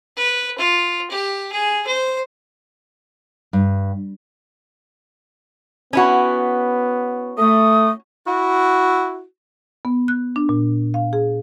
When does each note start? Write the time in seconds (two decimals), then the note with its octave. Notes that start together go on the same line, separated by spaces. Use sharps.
0.17 B4
0.58 F4
1.10 G4
1.52 G#4
1.87 C5
3.53 G2
5.93 B3 C#4 E4 F#4
7.38 A3 D#6
8.26 E4 F#4
9.85 B3
10.08 F#6
10.36 D4
10.49 A#2
10.94 F5
11.13 G#4